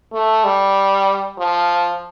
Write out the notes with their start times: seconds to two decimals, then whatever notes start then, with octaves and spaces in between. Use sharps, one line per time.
0.13 A3
0.44 G3
1.38 F3